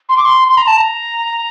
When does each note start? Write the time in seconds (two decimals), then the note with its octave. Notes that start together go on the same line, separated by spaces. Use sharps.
0.09 C6
0.17 D6
0.25 C6
0.48 C6
0.57 A#5
0.67 A5
0.77 A#5